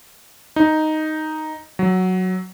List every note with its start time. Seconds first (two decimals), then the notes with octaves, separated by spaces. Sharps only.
0.56 D#4
1.79 F#3